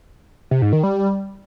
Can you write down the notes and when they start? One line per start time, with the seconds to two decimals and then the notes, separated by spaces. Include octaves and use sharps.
0.51 C3
0.62 G#2
0.73 D#3
0.83 G3